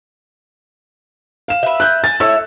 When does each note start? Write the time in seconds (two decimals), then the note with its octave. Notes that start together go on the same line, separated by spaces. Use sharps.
1.48 F5 E7
1.63 B4 E5
1.80 F#6 G6
2.04 G#5 A6
2.20 A3 E4 C#5 E6